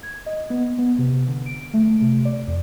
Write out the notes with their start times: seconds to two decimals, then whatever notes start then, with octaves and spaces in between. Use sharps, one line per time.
0.03 G#6
0.26 D#5
0.50 B3
0.79 B3
0.99 C3
1.28 D3
1.46 D7
1.74 A3
2.02 C3
2.25 D5
2.48 F2